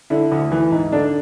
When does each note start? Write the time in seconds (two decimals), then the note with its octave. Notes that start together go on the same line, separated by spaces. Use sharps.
0.10 D3 E4
0.32 D2
0.52 E3
0.72 G#2
0.92 D3 D4